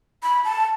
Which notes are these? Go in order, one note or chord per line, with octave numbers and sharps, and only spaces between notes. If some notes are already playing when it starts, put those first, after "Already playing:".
B5
A5